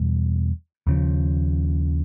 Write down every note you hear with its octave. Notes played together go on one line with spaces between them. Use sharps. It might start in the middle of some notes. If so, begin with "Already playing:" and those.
Already playing: E2 B2 G3
D#2 C#3 F3